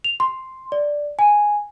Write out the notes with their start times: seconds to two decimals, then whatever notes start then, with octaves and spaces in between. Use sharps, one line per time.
0.04 F7
0.20 C6
0.72 D5
1.19 G#5